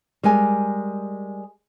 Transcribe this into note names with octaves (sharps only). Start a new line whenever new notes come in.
G3 G#3 A#4 G#5